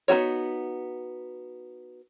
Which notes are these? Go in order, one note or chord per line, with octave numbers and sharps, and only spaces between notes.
B3 D#4 F#4 C#5